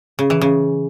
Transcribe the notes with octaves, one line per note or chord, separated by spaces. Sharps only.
C#3
E3
C#3